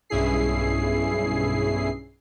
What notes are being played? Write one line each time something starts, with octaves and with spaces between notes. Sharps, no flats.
B1 G2 C#4 E4 G#4 C7